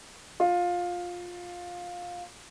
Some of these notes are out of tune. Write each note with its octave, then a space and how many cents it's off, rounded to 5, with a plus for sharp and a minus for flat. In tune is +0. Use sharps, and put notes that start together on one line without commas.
F4 +15